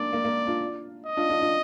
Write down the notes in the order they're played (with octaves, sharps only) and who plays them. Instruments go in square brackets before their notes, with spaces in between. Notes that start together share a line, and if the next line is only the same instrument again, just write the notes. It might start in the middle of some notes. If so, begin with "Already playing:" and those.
Already playing: [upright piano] A#3 D4 [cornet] D5
[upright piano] A#3
A#3
D4 F4
[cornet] D#5
[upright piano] D4 F4
D4 F4
D4 F4